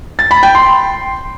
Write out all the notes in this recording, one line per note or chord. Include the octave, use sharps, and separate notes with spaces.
A6
B5
G5
C6